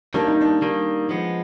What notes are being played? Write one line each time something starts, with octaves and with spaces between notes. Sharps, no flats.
D#3 G3 A#3 D4
D#4
D4
D#3 G3 A#3
F3 G#3 B3